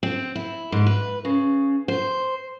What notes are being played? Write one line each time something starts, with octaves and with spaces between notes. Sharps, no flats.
C4
E4
G#2
B4
C#3
C5